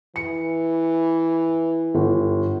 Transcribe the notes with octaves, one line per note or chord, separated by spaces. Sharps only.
E3 C#7
G1